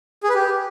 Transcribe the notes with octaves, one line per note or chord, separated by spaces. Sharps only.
G#4
B4
G4